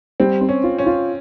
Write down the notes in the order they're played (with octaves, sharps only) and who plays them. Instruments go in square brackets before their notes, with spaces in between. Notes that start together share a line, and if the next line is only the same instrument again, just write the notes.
[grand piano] G3 [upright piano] C4
[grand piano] C4
[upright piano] C#4
[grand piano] F4
[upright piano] C#4
[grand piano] F4